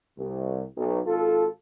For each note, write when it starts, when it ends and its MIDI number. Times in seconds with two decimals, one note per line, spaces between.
0.18 0.64 36
0.76 0.99 35
1.07 1.47 32
1.07 1.47 65
1.07 1.47 69